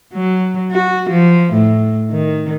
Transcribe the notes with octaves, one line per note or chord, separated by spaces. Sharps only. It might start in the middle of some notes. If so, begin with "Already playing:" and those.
F#3
F#4
F3
A2
D#3